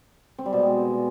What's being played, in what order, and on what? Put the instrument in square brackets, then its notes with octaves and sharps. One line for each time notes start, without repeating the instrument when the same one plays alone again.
[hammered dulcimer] C4
G3
B2
G#3